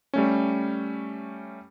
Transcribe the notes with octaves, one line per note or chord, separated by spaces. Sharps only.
G3 A3 C#4